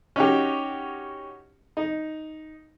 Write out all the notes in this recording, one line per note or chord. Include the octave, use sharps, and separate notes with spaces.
C#4 D#4 F#4 G4
D#4